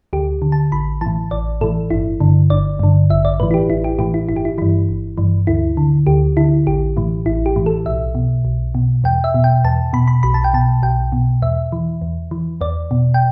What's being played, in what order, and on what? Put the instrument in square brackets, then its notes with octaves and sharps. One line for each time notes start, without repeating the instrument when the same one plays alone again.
[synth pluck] D2 G4
D3
A5
A1 B5
A2 E3 A5
A1 D5
A2 E3 A4
G1 E4
G2 D3
G1 D5
G2 D3
A1 E5
D5
A2 E3 B4
E4
G4
A1 E4
G4
A2 E3 G4
E4
G1 E4
G4
E4
G2 E3 E4
G1
G2 E3
D2 E4
D3
D2 G4
D3 E4
A1 G4
A2 E3
A1 E4
G4
A2 E3
A4
B1 E5
B2
B1
B2
E2 G5
E5
B2
G5
E2 A5
B2 B5
B5
B1 B5
A5
G5
B2 A5
B1 G5
B2
E2 E5
E3
E2
E3
E2 D5
B2
G5